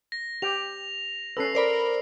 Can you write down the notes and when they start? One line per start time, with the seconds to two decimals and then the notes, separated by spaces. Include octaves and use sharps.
0.12 A#6
0.42 G4 G5 F7
1.37 C#4 A4 B4 E6 C7
1.55 A#4 C5 D5 B5